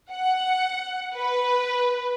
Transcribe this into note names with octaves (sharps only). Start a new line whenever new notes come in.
F#5
B4